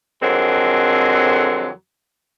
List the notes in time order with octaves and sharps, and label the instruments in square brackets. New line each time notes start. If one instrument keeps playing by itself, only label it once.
[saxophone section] F2 D3 F#3 G#3 C4 A#4